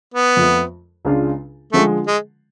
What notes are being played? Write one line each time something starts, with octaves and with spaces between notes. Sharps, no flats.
B3
F2 F3 A3
C#2 C#3 G#3 D4 F4
D3 F3 G#3 A3
G#3